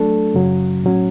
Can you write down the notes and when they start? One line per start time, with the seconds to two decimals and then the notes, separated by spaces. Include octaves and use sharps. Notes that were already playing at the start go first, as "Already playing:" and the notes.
Already playing: F#3 A3 D4 A4
0.34 F#2 C#3 F#3
0.84 A2 F#3 C#4